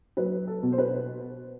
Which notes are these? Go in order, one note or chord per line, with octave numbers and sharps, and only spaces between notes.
F#3 B4
A4
B2
C5
B4